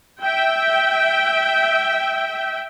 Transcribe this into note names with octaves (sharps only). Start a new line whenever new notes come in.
E5 G5